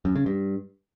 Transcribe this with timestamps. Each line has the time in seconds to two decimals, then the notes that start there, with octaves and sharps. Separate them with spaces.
0.05 F#2
0.16 C#3
0.26 G2